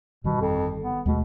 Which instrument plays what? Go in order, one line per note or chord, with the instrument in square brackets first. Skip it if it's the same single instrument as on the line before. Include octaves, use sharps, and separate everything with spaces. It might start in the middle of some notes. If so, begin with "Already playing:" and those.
[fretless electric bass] G1 D#3 G3 [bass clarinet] B2
[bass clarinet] F2
B3
[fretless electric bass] D#2 G#3 A3 [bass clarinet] B2